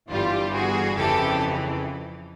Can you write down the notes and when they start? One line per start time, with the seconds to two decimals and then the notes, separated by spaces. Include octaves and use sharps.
0.10 G1 G2 E3 G3 F4 G4
0.53 F#4 G#4
0.96 F2 C#3 E3 G4 A4